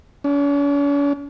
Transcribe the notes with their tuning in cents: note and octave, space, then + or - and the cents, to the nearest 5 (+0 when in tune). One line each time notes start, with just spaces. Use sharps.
C#4 +45